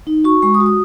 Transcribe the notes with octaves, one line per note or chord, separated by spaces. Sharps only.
D#4
F#4 C#6
G#3 C#6
D#6
F#4
D#6